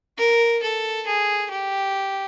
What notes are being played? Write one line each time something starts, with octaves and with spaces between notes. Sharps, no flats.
A#4
A4
G#4
G4